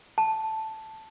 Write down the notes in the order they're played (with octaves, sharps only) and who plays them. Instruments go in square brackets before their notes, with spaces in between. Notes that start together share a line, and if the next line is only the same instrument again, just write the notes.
[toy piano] A5